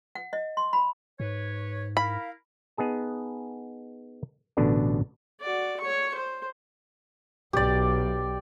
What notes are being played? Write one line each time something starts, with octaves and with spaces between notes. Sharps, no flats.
F#5
D#5
C6
B5
G#2 B4 C#5
E4 A#4 F5 B5
B3 D#4 G#4 A5
A1 B2 D3 B3 D4
F#4 D5
C#5 C#6
C5
B1 G4 D5